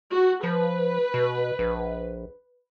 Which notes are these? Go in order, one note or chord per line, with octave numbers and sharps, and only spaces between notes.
F#4
F3 B4
B2
A#1